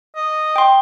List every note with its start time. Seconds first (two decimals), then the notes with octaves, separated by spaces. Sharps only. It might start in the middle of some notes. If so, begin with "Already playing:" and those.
0.16 D#5
0.56 G5 C6